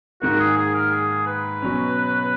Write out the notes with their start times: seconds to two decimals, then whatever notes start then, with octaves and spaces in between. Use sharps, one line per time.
0.22 G#2 D#3 A#3 F#4
0.39 G#4
0.57 G#4
0.74 A#4
0.92 G#4
1.27 B4
1.62 B2 F#3 C#4